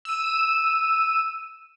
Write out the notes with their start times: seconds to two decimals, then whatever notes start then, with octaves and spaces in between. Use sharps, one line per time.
0.05 E6 D#7